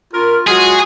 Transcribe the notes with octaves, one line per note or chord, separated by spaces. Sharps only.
F4 A#4
F#3 G#3 F4 F#4 G#4